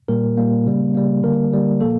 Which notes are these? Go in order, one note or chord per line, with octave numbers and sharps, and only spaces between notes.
A#2 G3 A#3 A#4
A#2 G3 A#3
C#3 G3 A#3
C#3 G3 A#3
D3 G3 A#3 A#4
D3 G3 A#3
A#2 F3 A#3 A4